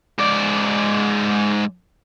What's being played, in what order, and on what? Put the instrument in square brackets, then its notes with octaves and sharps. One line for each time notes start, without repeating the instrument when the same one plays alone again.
[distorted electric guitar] G#2 D5